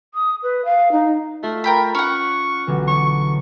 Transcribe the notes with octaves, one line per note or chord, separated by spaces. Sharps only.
D#6
B4
F5
D#4
A3 F4
A#4 G5 B5
C#4 F#5 C#6
B1 D3 E3
C#6